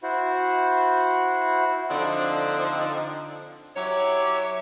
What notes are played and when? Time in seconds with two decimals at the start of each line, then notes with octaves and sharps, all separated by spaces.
0.03 E4 F#4 C5
1.90 D3 F3 C4 D4 D#4
3.77 F#3 E4 G4 C#5